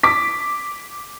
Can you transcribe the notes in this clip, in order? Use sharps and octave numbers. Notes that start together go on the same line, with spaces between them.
D6 B6